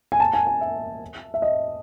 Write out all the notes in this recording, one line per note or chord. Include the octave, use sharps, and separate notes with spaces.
G#5
A5
G#5
G#5
E5
E5
D#5